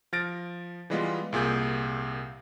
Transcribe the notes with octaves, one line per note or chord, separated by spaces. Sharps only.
F3 F6 A6 A#6 D7
E3 G3 G#3 B3 F4
C2 A#2 G#4 G6